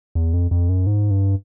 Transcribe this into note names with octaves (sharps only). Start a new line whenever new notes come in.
E2
F2
F2
F#2
G#2
G2